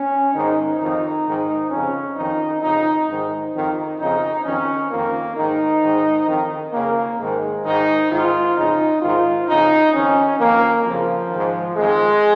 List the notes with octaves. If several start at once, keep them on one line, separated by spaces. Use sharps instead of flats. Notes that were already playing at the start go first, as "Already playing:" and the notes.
Already playing: C#4
G#2 D#3 D#4
F2 D#3 D#4
G#2 D#3
F2 C#3 C#4
F2 D#3 D#4
F2 C#3 D#4
G#2 D#3 D#4
F2 D#3
F2 C#3 D#4
F2 D#3 C#4
F2 D#3 A#3
G#2 D#3 D#4
G#2 D#3
F2 D#3
F2 C#3 A#3
G#2 D#3 G#3
G#2 D#3 D#4
G#2 D#3 F4
F2 C#3 D#4
G#2 D#3 F4
F2 C#3 D#4
F2 D#3 C#4
F2 D#3 A#3
F2 C#3 F3
G#2 D#3
F2 D#3 G#3